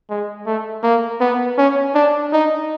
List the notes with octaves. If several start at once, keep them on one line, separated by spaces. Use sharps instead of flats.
G#3
A3
A#3
B3
C#4
D4
D#4